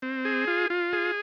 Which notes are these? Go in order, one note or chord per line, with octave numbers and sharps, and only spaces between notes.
C4
G#4
F4
F4
G#4